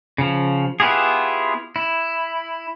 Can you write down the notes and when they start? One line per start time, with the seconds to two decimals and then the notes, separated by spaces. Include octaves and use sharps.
0.18 C#3 F3
0.80 B3 E4 F4 G4 G#4
1.76 E4